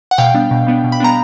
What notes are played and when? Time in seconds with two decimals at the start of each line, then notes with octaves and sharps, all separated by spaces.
0.11 F#5
0.18 B2 F5 G5
0.34 G3 B3 D4
0.51 B2
0.67 G3 B3 D4
0.84 B2
0.92 B5
1.00 G3 B3 D4 A#5